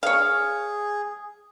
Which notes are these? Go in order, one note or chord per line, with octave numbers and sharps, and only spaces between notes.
G#4 C#5 F5